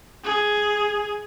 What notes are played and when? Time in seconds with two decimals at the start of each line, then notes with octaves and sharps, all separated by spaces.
0.24 G#4